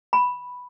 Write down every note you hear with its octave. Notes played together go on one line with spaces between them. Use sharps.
B5